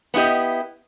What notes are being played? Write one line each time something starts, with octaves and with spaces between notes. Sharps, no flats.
B3 C#4 E4 G4 D#5